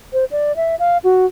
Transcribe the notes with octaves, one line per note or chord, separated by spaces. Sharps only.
C5
D5
E5
F5
F#4